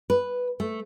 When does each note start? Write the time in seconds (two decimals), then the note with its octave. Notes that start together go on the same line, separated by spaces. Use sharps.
0.10 B4
0.60 A3